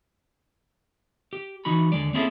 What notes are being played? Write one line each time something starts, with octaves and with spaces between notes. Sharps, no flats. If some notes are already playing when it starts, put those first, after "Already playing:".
G4
E3 D#4 F#4 B5
D#2 D3 G#3 D5
A#3 C4 C#4 E4 G#4 A4